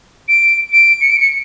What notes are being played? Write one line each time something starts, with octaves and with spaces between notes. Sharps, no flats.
D7
D7
C#7
D7
C#7